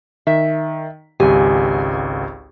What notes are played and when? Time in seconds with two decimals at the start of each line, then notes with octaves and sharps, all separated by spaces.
0.27 D#3 E5
1.20 G#1 C#2 G4 G#5